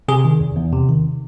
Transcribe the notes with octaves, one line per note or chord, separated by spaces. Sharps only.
C3 G#4
D#3
E2
E2
C3
D#3